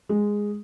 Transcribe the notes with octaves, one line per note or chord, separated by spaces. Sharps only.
G#3